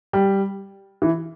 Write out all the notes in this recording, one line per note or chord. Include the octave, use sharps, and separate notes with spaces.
G3
E3